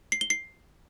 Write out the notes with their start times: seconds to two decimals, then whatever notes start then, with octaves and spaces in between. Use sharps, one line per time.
0.12 C7
0.21 G7
0.30 C7